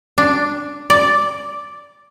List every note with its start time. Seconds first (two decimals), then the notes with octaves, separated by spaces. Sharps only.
0.18 D4
0.90 D5